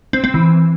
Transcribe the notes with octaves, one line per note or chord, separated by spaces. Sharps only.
C4
C4
E3